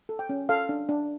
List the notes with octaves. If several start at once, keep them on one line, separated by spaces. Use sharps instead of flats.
A4
G5
C#4
A4 F5
D4
D4